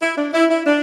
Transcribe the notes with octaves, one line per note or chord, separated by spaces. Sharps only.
E4
D4
E4
E4
D4